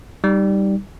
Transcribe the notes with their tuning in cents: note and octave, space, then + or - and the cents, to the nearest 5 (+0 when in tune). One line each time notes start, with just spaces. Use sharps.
G3 +0 D#4 -5